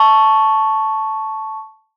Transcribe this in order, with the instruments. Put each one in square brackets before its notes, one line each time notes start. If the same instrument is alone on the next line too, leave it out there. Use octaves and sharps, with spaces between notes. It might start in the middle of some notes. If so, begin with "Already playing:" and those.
Already playing: [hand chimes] A5 C#6